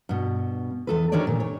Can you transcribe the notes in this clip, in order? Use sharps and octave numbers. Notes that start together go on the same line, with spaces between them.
G2 B2
E2 A4 B4
D#3 G3 D4 D#4 C#5 D5
A#2
C#5